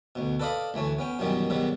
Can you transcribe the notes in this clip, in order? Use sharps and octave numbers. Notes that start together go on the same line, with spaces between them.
D2 B2
A4 B4 D5 D#5 F5 B5
D2 E3 A3 C#5
B3 C#4 G5
F#2 B2 D#3 E3 F#3 G3
G#2 B2 D#3 F#3 G3